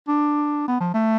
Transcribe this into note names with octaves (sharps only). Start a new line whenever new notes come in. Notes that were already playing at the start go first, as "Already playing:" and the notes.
D4
B3
F3
A3